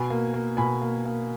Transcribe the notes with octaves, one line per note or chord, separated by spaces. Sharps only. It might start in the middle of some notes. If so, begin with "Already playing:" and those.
Already playing: B2 G#5 B5
A#3
A#3
B2 G#5 B5
A#3
A#3